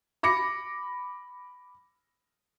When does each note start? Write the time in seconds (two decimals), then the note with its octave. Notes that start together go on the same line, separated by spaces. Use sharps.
0.23 B5 D6 A#6 C#7